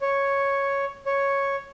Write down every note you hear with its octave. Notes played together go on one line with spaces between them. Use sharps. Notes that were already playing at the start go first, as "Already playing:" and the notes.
C#5
C#5